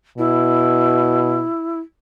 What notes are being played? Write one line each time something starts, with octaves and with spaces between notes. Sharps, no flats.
B2 E4